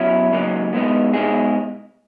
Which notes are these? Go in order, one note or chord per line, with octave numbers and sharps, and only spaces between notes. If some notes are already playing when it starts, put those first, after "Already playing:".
Already playing: B2 F#3 C#4 E4
C#2 C#3 F#3 A#3 D#4
B2 G#3 B3 D#4
B2 G#3 D#4 G#4